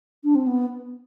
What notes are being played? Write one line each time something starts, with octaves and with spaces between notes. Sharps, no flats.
D4
C4
B3